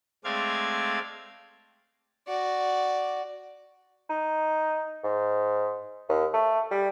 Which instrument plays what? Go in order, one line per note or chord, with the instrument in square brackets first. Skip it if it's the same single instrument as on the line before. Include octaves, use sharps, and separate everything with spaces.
[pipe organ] G#3 A3 C4 D5 F5 G#6
[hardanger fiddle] F#4 D5
[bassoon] D#4
G#2
D#2
A3
G3